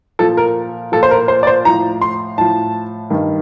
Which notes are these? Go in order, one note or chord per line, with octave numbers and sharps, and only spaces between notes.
A#2 F3 A4
A#4
A#2 F3 A4
C5
A#4
C5
D5
C5
A2 F3 A#5
C6
A2 F3 A5
G2 D#3